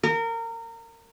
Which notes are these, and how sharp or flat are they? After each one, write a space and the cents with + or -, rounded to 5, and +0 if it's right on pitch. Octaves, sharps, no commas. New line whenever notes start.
A#4 -25